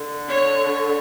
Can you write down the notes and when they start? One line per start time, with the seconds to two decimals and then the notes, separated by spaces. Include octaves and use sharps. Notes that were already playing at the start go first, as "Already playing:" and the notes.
Already playing: D3
0.28 C#5